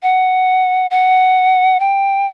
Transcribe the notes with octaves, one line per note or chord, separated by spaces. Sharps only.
F#5
F#5
G5